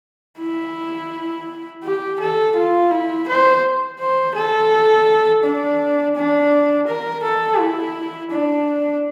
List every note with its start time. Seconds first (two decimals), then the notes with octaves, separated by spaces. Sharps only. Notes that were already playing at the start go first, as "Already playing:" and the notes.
0.39 E4
1.84 G4
2.20 A4
2.56 F4
2.91 E4
3.28 C5
4.00 C5
4.35 A4
5.44 D4
6.16 D4
6.88 A#4
7.24 A4
7.59 E4
8.31 D4